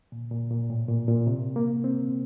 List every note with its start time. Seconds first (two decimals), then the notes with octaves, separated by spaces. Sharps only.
0.12 A#2
0.31 A#2
0.50 A#2
0.70 A2
0.88 A#2
1.08 A#2
1.27 C3
1.56 A#3
1.84 C4